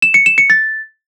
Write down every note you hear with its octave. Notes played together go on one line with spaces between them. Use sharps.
E7
C#7
E7
C#7
A6